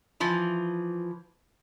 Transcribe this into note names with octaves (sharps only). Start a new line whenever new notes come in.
E3 F3